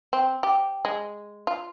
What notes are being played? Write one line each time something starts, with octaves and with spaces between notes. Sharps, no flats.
C4
G4
G#3
F4